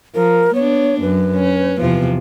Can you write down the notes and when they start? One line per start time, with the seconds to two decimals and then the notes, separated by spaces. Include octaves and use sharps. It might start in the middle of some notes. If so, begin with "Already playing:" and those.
0.15 F3 A#4
0.55 B3 D4 C#5
1.02 F#2 B4
1.36 C#4
1.80 E2 C3 F3